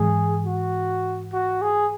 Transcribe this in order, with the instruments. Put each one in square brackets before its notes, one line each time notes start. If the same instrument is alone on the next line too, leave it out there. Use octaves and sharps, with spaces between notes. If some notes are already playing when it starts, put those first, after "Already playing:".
Already playing: [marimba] G#2 E3 G#3 [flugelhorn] G#4
[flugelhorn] F#4
F#4
G#4